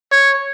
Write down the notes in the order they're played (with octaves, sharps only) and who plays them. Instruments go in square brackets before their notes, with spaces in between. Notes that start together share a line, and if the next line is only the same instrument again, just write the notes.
[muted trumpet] C#5